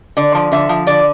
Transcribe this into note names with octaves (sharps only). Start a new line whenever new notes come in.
D3 D5
F3
D3 E5
F3
D3 D5